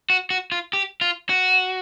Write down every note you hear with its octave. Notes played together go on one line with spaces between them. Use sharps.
F#4
F#4
F4
G4
F4
F#4